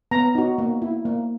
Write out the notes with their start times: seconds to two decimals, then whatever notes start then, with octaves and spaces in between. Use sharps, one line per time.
0.11 B3 A#5
0.35 D#4 F#4
0.58 A#3
0.82 E4
1.05 A#3